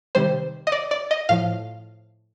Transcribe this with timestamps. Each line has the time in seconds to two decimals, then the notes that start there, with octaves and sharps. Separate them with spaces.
0.15 C3 D#3 G3 C5
0.67 D#5
0.72 D5
0.91 D5
1.11 D#5
1.29 A2 F3 F5